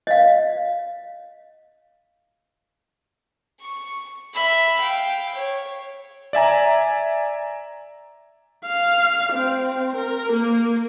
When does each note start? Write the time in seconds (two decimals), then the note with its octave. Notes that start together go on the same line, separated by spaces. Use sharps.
0.07 D#5 F5
3.60 C#6
4.34 E5 B5
4.79 F5 G5
5.34 C#5
6.33 D5 E5 G#5 A#5
8.65 F5
9.33 C4
9.96 A#4
10.32 A#3